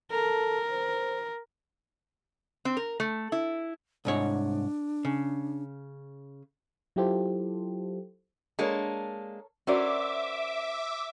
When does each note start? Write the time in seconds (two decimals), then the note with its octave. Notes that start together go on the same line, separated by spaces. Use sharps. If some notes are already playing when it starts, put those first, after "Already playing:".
0.11 A4 A#4
0.71 C5
2.65 C4
2.77 A#4
3.00 A3
3.32 E4
4.05 C2 G#2 D4 C#5
5.05 C#3
6.96 F#3 E4 F4 G4 A4 C5
8.59 G#3 A#3 D4 A4 A#4 C#5
9.67 C#4 F#4 A#4 C5 D5 E5 D6